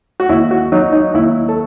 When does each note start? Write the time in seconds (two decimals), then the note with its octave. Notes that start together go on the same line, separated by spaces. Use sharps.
0.20 F#4
0.29 D#2 E4
0.51 F#4
0.72 F#3 D#4
0.92 D#4
1.14 D#2 E4
1.49 A4